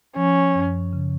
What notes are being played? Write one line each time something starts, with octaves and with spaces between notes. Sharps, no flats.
F3 C#4
F#2
C#3